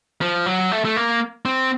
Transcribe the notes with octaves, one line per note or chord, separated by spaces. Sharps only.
F3
F#3
A3
A3
A#3
C4